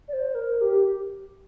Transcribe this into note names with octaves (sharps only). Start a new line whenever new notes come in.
D5
C5
A#4
G4